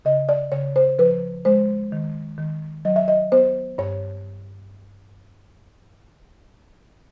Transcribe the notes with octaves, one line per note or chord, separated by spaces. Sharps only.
C#3 D#5
D5
C#3 C#5
C5
F3 B4
G#3 C5
D#3
D#3
F#3 D#5
E5
D#5
B3 C5
G2 C#5